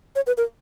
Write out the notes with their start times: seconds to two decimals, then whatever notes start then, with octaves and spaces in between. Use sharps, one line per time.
0.16 C#5
0.27 B4
0.37 A#4